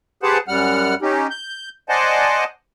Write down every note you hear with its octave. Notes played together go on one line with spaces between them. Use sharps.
G4 G#4 B4 C5 F#5 A5
F#2 G3 F#5 F6
C#4 D#4 G4
G6
C5 D5 D#5 F#5 G#5 A5